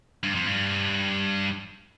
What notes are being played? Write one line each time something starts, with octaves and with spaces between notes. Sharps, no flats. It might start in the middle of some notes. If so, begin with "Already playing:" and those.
G2
F2
G2